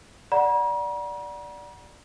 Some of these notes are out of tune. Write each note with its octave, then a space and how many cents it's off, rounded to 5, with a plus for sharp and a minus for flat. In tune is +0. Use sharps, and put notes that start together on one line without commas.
D5 +0 F#5 +0 A#5 +45